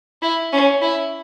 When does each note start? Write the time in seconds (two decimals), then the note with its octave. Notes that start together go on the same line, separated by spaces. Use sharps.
0.22 E4
0.52 C#4
0.82 E4